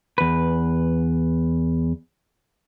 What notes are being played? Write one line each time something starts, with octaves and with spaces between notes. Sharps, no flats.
E2 B4